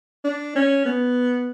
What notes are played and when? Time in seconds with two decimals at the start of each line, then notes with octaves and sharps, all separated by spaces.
0.24 D4
0.56 C#4
0.85 B3